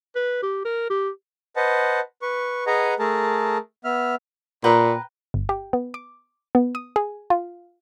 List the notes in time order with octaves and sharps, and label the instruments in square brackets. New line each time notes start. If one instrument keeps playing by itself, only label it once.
[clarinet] B4
G4
A#4
G4
[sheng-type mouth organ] B4 C5 D#5 F#5 A5
B4 C#6
G#4 B4 D#5 F#5 G#5 A#5
A3 G#4 A#4 A5
B3 E5 F6
[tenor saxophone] A#2 [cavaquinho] B4 G5 A#5
[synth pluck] G1
G4
B3
D6
B3
D#6
G#4
F4